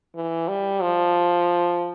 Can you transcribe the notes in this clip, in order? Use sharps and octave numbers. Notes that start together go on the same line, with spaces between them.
E3
G3
F3